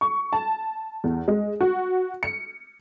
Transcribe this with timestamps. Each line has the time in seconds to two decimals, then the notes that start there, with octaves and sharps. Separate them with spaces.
0.01 C#6
0.33 A5
1.04 E2
1.28 G#3
1.61 F#4
2.23 C#7